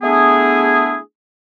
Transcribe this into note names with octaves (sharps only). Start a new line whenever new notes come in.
A3 B3 D4 E4 G#4